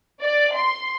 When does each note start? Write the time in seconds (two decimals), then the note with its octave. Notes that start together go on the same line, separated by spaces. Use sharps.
0.22 D5
0.54 C6